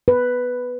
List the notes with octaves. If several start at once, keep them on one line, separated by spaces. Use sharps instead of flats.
B4